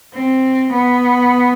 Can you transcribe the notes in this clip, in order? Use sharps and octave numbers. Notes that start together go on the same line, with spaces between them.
C4
B3